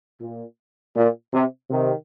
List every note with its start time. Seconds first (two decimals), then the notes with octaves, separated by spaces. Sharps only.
0.20 A#2
0.95 A#2
1.32 C3
1.70 C3 D#3